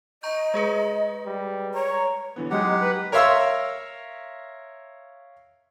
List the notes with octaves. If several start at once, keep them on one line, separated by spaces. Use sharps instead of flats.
D#5 A#5 C#6 G6
G#3 G#4 B4
G3
C#5 A#5
D3 E3 B3
F#3 G#3 D#4 G4 F#5
B4
A#4 C#5 E5 F5 C6 E6